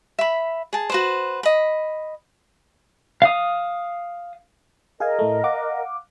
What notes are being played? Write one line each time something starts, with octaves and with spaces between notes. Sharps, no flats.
E5 B5
G#4 A5
F#4 B4 C5
D#5 B5
F5 D#6
G#4 A#4 D#5 F5 G#5
A2 A3
F5 F#5 D6